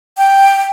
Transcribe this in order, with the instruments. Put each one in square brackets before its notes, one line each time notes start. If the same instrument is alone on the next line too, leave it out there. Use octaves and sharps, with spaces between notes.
[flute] G5